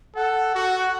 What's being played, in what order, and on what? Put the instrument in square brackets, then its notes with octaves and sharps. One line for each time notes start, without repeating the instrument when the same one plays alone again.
[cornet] A4 [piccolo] F#5
[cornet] F#4